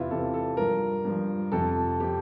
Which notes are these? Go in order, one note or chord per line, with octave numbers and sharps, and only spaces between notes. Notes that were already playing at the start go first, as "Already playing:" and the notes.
Already playing: E2 C3 E3 E4 F4
E2 C3 E3 A4
A4
G2 F3 A#4
G2 F3
F2 C3 F3 A4
C3 F3 G4